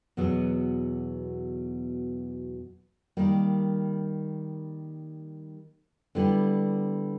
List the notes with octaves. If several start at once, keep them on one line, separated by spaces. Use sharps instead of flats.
E2 B2 F#3 B3
D#3 G3 A#3
D3 G3 B3 E4 G4